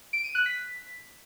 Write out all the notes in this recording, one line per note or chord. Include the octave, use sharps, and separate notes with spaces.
D7
D#7
F#6
B6